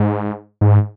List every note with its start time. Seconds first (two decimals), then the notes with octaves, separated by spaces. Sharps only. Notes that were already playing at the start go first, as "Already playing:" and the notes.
Already playing: G#2
0.61 G#2